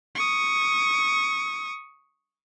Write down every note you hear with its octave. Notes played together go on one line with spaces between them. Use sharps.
C#6 D#6